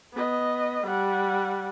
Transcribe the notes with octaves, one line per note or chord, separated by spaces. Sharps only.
B3 D#5
G3 F#5